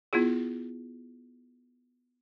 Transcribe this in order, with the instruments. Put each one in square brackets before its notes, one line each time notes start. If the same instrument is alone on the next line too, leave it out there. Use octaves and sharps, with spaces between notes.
[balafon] B3 E4 F4 G#4